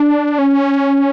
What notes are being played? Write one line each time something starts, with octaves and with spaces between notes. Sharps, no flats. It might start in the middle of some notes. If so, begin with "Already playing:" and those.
Already playing: D4
C#4